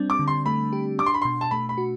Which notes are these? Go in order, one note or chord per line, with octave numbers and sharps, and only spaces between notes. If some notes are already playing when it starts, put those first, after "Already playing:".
Already playing: G3 C4 D4
D6
D3
C6
A3 B5
G4
D4 D6
C6
B5
B2 C6
A5
A3 B5
B5
F#4